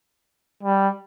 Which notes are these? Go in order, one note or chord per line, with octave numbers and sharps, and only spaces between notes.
G3